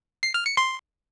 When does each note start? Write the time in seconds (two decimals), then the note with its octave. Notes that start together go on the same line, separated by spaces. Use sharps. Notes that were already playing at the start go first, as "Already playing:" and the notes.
0.23 C7
0.34 F6
0.46 C#7
0.57 C6